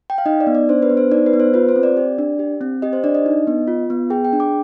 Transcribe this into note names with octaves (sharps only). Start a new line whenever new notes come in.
G5
F5
D#4 D#5
D5
B3
D5
D4 C5
B4
B3
C5
D#4 D5
B4
B3
C5
F4 B4
C5
C4
D5
G4
D4
G4
C4
G4 D#5
C5
D4 D5
D#5
D#4
B3
F4
B3
G#4 G5
G5
D4
D6